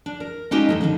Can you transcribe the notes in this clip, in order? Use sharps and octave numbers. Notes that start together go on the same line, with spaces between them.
D4
A#4
G#3 C#4 D#4 G4 D#5 F5
F2 G#2 A3
D3 D#3 F3 D#4